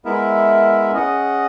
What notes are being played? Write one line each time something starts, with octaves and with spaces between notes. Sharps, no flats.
G#3 B3 E4 A#4 E5
C#4 G#4 D#5 F#5